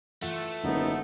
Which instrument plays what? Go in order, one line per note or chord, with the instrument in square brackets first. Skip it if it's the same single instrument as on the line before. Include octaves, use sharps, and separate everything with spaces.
[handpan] E3 F4 F#5 [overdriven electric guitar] A3
[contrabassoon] F#1 [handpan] D3 G#3 [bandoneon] B3 D#4